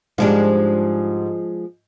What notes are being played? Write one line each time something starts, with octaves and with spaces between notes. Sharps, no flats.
G#2 F3 G3 G#3 D4